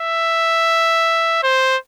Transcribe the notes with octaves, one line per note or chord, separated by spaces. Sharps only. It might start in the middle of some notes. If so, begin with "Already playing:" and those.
Already playing: E5
C5